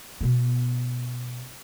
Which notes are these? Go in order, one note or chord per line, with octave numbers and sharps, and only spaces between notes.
B2 B3